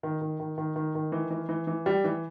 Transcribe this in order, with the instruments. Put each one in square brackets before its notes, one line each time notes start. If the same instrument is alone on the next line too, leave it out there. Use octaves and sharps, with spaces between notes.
[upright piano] D#3
D#3
D#3
D#3
D#3
D#3
E3
E3
E3
E3
G3
E3